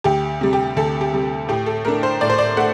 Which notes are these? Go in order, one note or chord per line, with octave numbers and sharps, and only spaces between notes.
D2 G4
C3 G3
G4
D2 A4
G4
C3 G3
A2 G4
A4
A3 D4 A#4
C5
A2 D5
C5
D5
A3 F#5